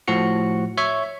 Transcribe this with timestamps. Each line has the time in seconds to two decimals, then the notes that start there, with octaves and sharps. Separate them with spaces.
0.08 A2 F3 F#4 C#7
0.78 C#5 E5 C#6